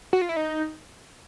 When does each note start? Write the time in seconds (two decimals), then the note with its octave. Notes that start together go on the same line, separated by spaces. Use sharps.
0.13 F#4
0.22 F4
0.29 E4
0.37 D#4